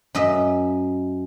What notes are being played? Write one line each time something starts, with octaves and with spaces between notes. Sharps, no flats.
F#2 D#5 E5